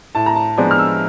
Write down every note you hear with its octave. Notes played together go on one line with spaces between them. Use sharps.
A2 A5
A#5
A5
F3 G#3 B3 D4
F6
E6